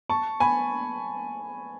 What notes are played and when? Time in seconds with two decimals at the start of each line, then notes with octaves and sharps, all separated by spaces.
0.09 A5 C#6
0.40 G#5 B5